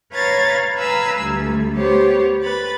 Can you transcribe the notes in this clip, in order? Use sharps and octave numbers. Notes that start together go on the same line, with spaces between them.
B4 C#5 F5 A#5 G#6 A6
B4 F5 G#5 A#5 E6
D2 G3
B3 G4 C5 C#5
B4 B5 A6